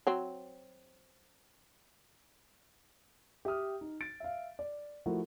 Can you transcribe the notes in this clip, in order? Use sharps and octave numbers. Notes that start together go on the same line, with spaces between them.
F#3 C4
G4 E5 G5 D#6 F6
D#4
A6 D7
E5 F5
D5
F3 A3 E4 F#4 A#4